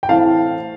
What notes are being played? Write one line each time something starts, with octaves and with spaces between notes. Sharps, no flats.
G5
A2 E3 A3 C4 F5 A5